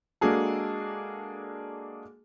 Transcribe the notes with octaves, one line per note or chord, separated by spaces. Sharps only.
G#3 A#3 D4 F#4 G#4 A4